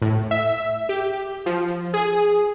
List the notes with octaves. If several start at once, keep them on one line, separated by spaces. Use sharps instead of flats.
A2
E5
G4
F3
G#4